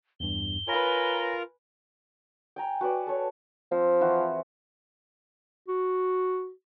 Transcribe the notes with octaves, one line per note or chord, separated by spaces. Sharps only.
E2 G2 G7
F4 A#4 B4 C#5 G#5 A#5 B5 A#6
G5 G#5 A#5
F#4 B4 D5
A4 C#5
F3 C4
E3 F4 F#4
G#4
F#4